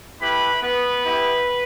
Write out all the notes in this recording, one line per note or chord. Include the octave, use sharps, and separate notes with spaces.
A3 E4 G4 B4 B5
B3 B4
B3 E4 G4